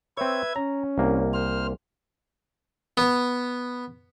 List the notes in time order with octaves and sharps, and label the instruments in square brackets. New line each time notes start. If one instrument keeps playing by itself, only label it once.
[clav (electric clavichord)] C4 C#5 [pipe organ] B4 E5 G#6
[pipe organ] C#4 [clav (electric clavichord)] A#5
[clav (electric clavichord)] C2 A#3
[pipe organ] C5 F6
[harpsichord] B3